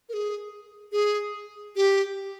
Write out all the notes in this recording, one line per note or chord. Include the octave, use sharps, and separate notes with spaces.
A#4
G#4
G#4
G4